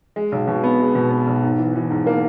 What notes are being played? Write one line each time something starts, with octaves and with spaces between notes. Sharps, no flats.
G#3
B1
B2
B3
G#3
B2
B3
B1
G#2
E3
E3
G#2
A#3